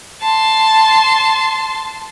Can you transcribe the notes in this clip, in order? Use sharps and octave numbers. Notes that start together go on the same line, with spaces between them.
A5 C6